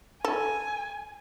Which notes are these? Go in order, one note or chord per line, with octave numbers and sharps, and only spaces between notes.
A4 G#5